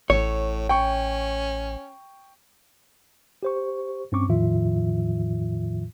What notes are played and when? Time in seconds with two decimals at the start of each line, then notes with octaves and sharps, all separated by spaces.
0.10 A1 A2 C#5
0.69 C#4 G5 C#6
3.43 G4 C5 C#6
4.12 G2 C4 C#4 C#6 D6
4.28 E2 A2 D#3 F3 F4 E5